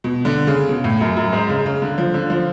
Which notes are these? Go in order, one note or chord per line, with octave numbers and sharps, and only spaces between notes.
B2
D3
C#3
B2
A2
F#2
F#2
G#2
C#3
C#3
D3
F3
D3
F3